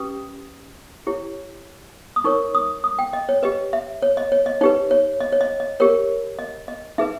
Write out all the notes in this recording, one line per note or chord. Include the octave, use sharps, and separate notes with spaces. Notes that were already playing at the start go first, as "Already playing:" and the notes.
Already playing: C#4 G4 B4 D#6
E4 G4 C#5
D#6
D#4 A#4 C#5 C#6
D#6
D#6
G5
D#5
C#5
G4 B4 D#5
E5
C#5
D#5
C#5
D#5
D#4 G4 B4 C#5
C#5
D#5
C#5
D#5
D#5
G4 A#4 C#5
D#5
D#5
D#4 G#4 B4 E5